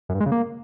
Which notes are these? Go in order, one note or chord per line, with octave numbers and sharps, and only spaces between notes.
F#2
G2
G#3
C#3
A#3